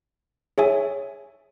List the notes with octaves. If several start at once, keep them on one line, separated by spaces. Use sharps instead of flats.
G#4 C#5 E5 G#5